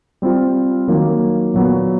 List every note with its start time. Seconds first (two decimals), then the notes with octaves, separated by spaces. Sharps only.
0.22 G3 C4 F4
0.88 D#3 F#3 A#3
1.54 A#2 F#3 B3